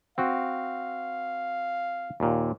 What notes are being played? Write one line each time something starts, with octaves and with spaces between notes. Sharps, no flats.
C4 F#4 F5
D#2 A#2